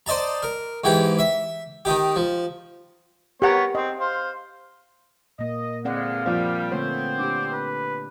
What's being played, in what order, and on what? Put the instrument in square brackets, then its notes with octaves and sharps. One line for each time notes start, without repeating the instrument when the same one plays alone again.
[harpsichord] C5 D5 D#5 A5 A#5
A#4
G#2 E3 G4 G5
E5
D#3 D#4 G4
F3
[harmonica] B3 A#4 C#5 [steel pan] G4 F#5
[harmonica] C4 [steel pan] D#5
[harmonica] C5 F5
[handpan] A#2 A#3 [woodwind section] D#5
[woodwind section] E2 D3 G#3 [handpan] C4 D5 F#5 [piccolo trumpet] F5
[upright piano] F3 [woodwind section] G3 [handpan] A#3 F4
[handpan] D3 A3 C#5 [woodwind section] B3 C4 C5
[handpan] D4 G4 [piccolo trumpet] D6
[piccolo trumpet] B4